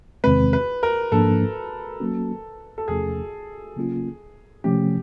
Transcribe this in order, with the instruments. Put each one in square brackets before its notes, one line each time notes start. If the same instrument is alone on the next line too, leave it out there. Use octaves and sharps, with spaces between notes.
[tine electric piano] E2 C3 D#3 G#3 C4 [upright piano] B4
[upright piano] B4
A#4
[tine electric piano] G#2 F3 A#3 D4 [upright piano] A4
[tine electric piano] F#3 A#3 C#4 F#4
[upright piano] A4
[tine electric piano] E2 C3 F3 A3 C#4 [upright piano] G#4
[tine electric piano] C#3 F#3 A#3 C#4 F4
[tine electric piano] C3 F3 A3 C#4 [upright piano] G4